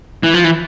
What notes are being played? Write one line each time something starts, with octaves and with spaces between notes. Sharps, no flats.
E3
F3
E3